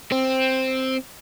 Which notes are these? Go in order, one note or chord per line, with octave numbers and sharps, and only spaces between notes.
C4